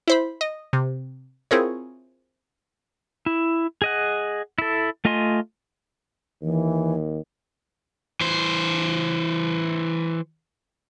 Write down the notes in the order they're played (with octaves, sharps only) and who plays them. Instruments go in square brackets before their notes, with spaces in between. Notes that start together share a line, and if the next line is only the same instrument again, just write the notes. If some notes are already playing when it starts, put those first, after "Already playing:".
[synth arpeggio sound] E4 C5 B5
D#5
C3
C4 E4 F4 G#4 A#4 C#5
[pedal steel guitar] E4
G#4 D#5 F#5
E4 A4
A3 F4 D#5 G#5 C6
[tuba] D#2 [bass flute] E3
[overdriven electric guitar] E3 C5